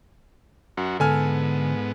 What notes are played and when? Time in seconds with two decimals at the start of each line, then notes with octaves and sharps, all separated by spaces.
0.77 F#2 F#4
1.00 G#2 D3 B3 A4 G#5 F6